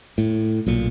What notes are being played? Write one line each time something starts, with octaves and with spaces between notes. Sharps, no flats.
A2
B1 A#2